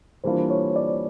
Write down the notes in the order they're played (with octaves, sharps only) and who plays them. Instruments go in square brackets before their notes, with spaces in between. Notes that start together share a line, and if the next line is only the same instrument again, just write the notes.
[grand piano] E3 G3 A#3 D4 F4 [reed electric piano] C5
[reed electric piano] C#5
D5